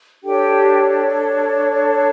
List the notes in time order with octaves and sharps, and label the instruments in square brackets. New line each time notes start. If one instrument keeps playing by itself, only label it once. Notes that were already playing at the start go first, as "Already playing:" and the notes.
[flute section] D4 G4 A4 C#5 G5